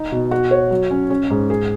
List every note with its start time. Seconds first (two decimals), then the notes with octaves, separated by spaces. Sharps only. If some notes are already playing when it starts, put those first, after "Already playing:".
Already playing: D#4
0.12 B2
0.31 F#4
0.51 C#5
0.71 F#3
0.91 C#4
1.10 C#4
1.30 G#2
1.50 G#4